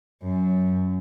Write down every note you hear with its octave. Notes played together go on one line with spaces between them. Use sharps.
F#2